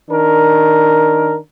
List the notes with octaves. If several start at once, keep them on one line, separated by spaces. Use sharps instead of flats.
D#3 D4 A#4